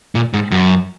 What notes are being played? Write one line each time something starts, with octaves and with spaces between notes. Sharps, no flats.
A#2
G#2
F#2